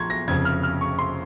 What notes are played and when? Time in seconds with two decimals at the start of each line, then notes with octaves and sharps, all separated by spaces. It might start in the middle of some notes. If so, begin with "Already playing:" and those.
Already playing: A#1 F3 A#5 C6 C#6 G#6
0.10 A#6
0.28 F1 F2 C#3 G#6
0.45 F6
0.63 F6
0.81 C#6
0.99 C6